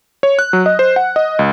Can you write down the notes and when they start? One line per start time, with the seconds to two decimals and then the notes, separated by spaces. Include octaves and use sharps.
0.23 C#5
0.39 F#6
0.53 F#3
0.66 D#5
0.79 C5
0.96 F#5
1.16 D#5
1.39 C#2